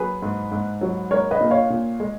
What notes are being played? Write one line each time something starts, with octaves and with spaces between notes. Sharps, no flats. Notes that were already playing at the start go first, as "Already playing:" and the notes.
Already playing: F#3 G#4 B4
G#2
G#2
F#3
G#3 A#4 C#5
B4 D#5
A#2
C#5 F5
A#2
G#3